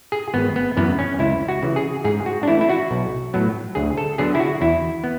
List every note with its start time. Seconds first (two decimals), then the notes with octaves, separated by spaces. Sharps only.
0.12 G#4
0.34 G#1 B3
0.56 B3
0.77 F#2 E3 B3
0.99 C#4
1.19 C#2 E4
1.48 F#4
1.63 C#3 E3
1.76 G#4
2.04 G#2 G#4
2.26 F#4
2.43 D4
2.48 E3 A3 E4
2.61 E4
2.69 F#4
2.91 B1
3.34 A2 F#3 B3
3.75 D2 G#4
3.97 A4
4.18 D3 F#3 B3 G#4
4.35 E4
4.40 F#4
4.61 E2 E4
5.04 B3